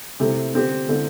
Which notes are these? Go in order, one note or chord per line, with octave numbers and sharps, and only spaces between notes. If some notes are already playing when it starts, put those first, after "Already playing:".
C3 A3 C4 E4
D3 C4 G4
D3 A3 C4 E4